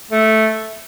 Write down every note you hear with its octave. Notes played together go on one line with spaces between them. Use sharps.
A3